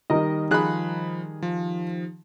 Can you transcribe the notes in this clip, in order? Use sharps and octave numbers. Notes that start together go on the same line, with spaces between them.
D#3 G3 A#4 D#5
F3 D#4 G#4 B5 F#6
F3